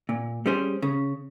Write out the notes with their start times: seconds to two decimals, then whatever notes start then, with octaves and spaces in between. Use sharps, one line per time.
0.09 A#2
0.46 G3 C#4 G#4 C5
0.82 C#3